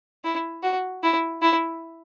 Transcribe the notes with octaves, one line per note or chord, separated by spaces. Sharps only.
E4
F#4
E4
E4